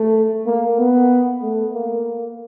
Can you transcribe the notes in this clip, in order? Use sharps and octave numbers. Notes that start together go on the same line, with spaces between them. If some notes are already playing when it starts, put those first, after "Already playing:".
Already playing: A3
A#3
B3
A3
A#3